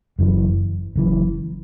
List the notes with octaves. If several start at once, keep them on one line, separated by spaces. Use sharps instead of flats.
F#1 F#2 E3
F#1 F#2 E3